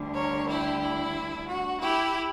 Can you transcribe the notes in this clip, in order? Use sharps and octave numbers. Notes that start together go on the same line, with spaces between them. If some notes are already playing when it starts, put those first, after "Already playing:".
Already playing: D2 D3 G3
A#4 C#5
E4 G4
E4
F#4
E4 G4